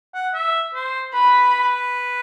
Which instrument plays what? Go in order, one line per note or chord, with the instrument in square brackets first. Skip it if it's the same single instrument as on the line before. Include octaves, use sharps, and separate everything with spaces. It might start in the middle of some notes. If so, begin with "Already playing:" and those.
[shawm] F#5
E5
C5
[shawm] B4 [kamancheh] B5